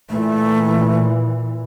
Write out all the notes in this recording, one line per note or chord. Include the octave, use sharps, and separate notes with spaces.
A#2 E3 A3